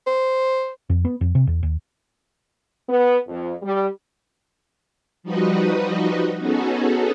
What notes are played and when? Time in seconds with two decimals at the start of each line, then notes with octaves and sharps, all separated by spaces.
0.07 C5
0.90 F2
1.05 B3
1.21 F2
1.35 C3
1.47 E2
1.63 D#2
2.89 B3
3.28 F2
3.62 G3
5.23 F3 G3 D#4 F#4 B4 D#5
6.39 B3 C#4 D#4 F#4 G#4 A4